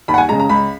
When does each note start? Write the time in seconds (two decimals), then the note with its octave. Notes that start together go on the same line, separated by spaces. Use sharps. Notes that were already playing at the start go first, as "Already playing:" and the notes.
0.08 D#2 B5
0.14 F#5
0.18 G#5
0.29 C#3 G#3 A#5
0.39 A#5
0.49 C#2 B5